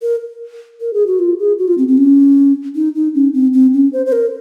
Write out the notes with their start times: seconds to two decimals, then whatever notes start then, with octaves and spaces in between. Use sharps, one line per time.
0.02 A#4
0.81 A#4
0.94 G#4
1.07 F#4
1.19 F4
1.39 G#4
1.59 F#4
1.68 F4
1.78 C4
1.88 C4
1.98 C#4
2.76 D#4
2.95 D#4
3.15 C#4
3.34 C4
3.53 C4
3.74 C#4
3.93 C5
4.06 C5
4.12 A#4